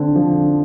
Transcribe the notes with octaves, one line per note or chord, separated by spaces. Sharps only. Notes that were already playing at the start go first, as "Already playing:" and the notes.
Already playing: D3 C4
F3